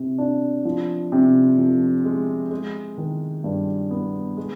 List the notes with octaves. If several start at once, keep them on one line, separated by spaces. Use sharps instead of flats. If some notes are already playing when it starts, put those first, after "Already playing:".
Already playing: C3
D4
F3
C3
F2
G#3
G#3
D#3
G2
B3
G#3